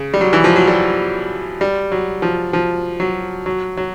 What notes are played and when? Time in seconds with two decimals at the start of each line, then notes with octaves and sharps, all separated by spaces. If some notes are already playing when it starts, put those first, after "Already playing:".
Already playing: C#3
0.14 G3
0.21 F#3
0.33 E3
0.44 F3
0.56 F#3
0.67 G3
1.61 G3
1.92 F#3
2.22 F3
2.53 F3
3.00 F#3
3.46 F#3
3.77 F#3